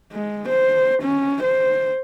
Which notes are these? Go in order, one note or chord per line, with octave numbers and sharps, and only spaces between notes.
G#3
C5
C#4
C5